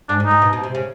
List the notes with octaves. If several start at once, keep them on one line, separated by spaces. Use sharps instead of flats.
G#2 D4
G#2
D#4
G#2
B2
B2
C3
C#3